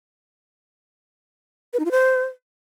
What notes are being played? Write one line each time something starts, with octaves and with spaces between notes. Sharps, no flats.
B4
D#4
F4
C5